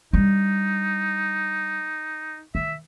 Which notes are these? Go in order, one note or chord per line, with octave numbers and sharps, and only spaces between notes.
G3 D4 D#4
D#3 E5